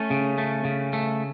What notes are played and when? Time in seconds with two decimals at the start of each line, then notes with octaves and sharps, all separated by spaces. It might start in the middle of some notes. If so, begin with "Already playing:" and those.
Already playing: A3 C#4
0.10 C#3
0.38 A3
0.65 C#3
0.93 A3